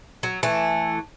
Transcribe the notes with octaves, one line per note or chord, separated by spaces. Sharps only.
F#3
E3 A3